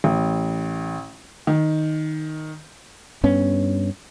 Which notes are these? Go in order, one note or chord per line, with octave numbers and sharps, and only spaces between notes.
A1
D#3
G2 B3 C#4